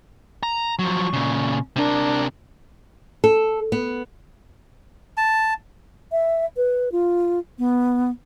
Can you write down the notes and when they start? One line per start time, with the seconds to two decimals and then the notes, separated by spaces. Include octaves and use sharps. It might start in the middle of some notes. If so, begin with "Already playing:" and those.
0.43 A#5
0.79 F3 F#3 C#6
1.13 A#2 C#3
1.76 C3 D4 A#4
3.24 A4
3.72 B3
5.17 A5
6.12 E5
6.56 B4
6.92 F4
7.58 B3